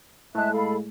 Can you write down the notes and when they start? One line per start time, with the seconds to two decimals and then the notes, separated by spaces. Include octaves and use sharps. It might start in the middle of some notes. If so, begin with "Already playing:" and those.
0.35 A2 G#3 E5 A5 F#6
0.53 A4 F5 B5